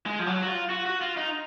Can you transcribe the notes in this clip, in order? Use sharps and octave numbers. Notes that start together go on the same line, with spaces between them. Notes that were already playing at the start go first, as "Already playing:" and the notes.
G#3
F3
F#3
F#4
F4
F#4
F#4
F4
D#4